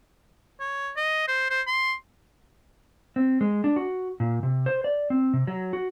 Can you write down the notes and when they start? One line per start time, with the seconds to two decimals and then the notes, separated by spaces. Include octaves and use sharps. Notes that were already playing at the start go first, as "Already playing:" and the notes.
0.60 C#5
0.96 D#5
1.28 C5
1.50 C5
1.67 C6
3.16 C4
3.41 G#3
3.64 D4
3.76 F#4
4.20 A#2
4.43 C3
4.66 C5
4.84 D5
5.10 C4
5.33 C3
5.47 F#3
5.73 F#4